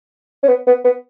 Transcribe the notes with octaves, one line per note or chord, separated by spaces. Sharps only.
C#4
B3
B3
B3